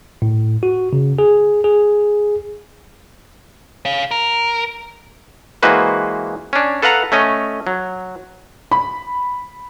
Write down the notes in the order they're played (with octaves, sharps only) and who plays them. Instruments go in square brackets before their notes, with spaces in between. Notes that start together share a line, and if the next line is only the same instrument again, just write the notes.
[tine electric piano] A2
F#4
C#3
G#4
G#4
[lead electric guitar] C#5 F5
A#4
[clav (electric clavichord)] E3 G#3 A#3 F#4 B4 C5
C#4 D4
A4 B4 F5 F#5 A#5
A3 C#4 D#5
F#3
[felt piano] B5